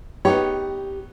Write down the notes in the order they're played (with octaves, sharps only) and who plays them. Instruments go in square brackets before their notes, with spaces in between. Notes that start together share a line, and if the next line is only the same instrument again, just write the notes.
[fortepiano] B3 D#4 C#5 [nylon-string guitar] G4